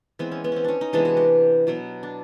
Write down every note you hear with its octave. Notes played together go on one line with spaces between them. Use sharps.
E3 G#3 B3 C4
C#4
B3
C4 C#4
C#4 D4
D#4
C3 E3 G#3 B3 D4
F#4
G4
B2 F#3 B3
D4